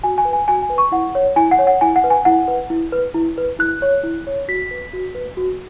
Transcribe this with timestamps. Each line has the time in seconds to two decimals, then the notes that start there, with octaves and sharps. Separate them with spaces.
0.04 F#4 G#5
0.18 G#5
0.25 B4
0.33 G#5
0.48 F#4 G#5
0.62 G#5
0.70 B4
0.78 C#6
0.92 E4 F#5
1.15 C#5
1.36 E4 G#5
1.51 F#5
1.59 C#5
1.67 F#5
1.81 E4 G#5
1.96 F#5
2.04 B4
2.10 G#5
2.25 E4 F#5
2.48 B4
2.70 E4
2.92 B4
3.14 E4
3.38 B4
3.59 E4 F#6
3.82 C#5
4.03 E4
4.27 C#5
4.48 F#4 B6
4.71 B4
4.93 F#4
5.15 B4
5.37 F#4